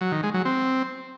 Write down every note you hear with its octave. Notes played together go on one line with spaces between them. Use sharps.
F#3
D#3
G#3
F#3
C4